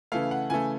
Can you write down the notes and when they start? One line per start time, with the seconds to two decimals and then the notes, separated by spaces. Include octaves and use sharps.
0.12 C#3 E3 A3 F5
0.31 F#5
0.50 C#3 E3 A3 G#5